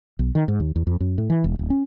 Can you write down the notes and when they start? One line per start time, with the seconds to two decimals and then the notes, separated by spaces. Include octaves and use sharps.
0.19 B1
0.35 D#3
0.48 G#2
0.60 D#2
0.76 E2
0.87 F2
1.00 F#2
1.18 A2
1.30 E3
1.44 E1
1.59 D1
1.70 C#4